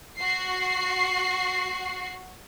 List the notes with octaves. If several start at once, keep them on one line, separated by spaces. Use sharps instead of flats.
F#4 C7